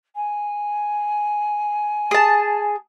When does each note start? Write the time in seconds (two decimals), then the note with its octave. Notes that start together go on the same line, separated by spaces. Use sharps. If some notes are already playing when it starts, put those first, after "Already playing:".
0.15 G#5
2.11 G#4 A5